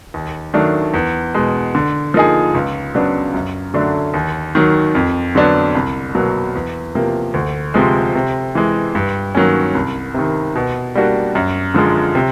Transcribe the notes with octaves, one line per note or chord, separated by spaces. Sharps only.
D#2
D#3 F#3 A3 D4
E2
B2 G#3
D3
F3 A#3 D#4 G#4
C#2
C#3 F#3 B3 D4
F#2
D3 F#3 A3 D4
D#2
D#3 F#3
F2
D3 F#3 B3 D4
C2
B2 F#3 A#3
E2
C3 F3 A#3
D2
C3 F3 G#3
C3
E3 G#3
G2
D#3 F#3 A#3 C#4
C2
C3 D#3
B2
G3 A#3 D4 F#4
F#2
D3 F3 G#3
C3